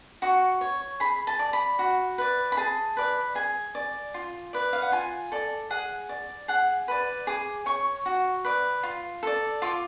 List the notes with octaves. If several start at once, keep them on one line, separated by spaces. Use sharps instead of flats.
F#4 C#6
C#5
G#4 B5
A5
D5
B5
F#4
B4 D5
B5
G#4 A5
B4 D5
G#4 G#5
D5
F4
B4 D5
F5
F#5
F4 G#5
A4 D5
G#4 F#5
D5
G#4 F#5
B4 D5
G#4 D6
C#5 C#6
F#4
B4 D5
F4
A4 D5
F4 D6